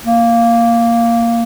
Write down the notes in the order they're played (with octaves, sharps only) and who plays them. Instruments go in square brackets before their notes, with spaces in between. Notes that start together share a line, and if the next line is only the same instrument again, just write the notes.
[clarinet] A#3